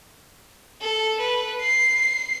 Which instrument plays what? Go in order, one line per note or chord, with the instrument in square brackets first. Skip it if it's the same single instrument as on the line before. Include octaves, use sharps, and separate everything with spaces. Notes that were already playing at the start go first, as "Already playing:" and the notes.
[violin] A4
B4
C7